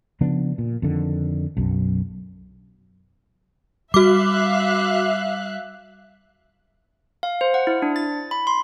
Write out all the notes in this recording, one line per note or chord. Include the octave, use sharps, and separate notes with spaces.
C#3 F3 B3 D4
A#2
F2 D3 D#3
B1 F#2
G3 F#4 E5 F5 D6 F#6
F5
C5
F#5
E4
D4
A6
B5
C6